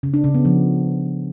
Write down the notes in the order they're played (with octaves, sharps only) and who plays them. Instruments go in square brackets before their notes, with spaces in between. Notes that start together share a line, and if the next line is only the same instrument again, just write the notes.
[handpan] C#3
D4
C#3
B3
F3